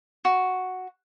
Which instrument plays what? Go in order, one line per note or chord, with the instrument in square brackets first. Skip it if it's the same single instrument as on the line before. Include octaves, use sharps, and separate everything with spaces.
[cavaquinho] F#4